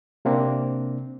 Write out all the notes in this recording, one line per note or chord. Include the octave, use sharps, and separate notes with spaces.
C3 A#3 C4 D4